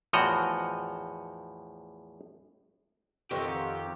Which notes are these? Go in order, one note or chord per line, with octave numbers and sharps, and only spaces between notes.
E2 A2 F3 F#4 D#5 A#5
F2 D#3 C4 F4 G4 F#5 C#6